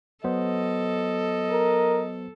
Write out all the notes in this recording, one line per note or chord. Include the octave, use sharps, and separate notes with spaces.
F#3 B3 A4 C5 D#5
A#4